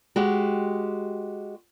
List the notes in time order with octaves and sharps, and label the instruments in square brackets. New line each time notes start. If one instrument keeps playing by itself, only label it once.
[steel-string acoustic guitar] G#3 F#4 G4